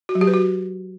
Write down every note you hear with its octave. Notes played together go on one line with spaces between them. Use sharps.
F#4
F#3
G4
B4
F#4